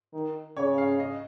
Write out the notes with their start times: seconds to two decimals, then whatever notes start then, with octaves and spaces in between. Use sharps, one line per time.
0.13 D#3
0.57 C#3 C#5
0.78 F5
1.00 D#5